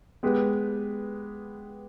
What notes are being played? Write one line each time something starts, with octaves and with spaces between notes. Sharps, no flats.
G#3 B3 G4 B4